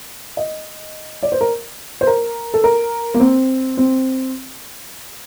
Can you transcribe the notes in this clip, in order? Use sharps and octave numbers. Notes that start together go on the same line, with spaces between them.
D#5
D5
C5
A#4
C5
A#4
A4
A#4
A#3
C4
C4